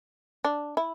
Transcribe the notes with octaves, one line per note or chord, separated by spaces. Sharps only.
D4
E4